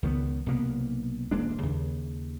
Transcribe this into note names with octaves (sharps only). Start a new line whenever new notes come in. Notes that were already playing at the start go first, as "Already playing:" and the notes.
C#2 D#3 A#3 B3
B1 C3 A#3 B3
D#1 G#3 A#3 D4
D#2 C#3